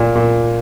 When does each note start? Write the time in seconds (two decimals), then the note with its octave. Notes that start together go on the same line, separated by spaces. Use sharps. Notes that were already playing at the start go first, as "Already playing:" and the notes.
Already playing: A#2
0.15 A#2